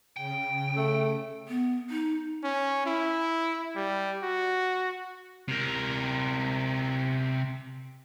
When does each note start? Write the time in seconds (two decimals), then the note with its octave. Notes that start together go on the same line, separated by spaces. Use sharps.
0.17 C#3 G5
0.77 A3
1.48 B3
1.90 D#4
2.44 C#4
2.86 E4
3.76 G3
4.23 F#4
5.48 C3 A#4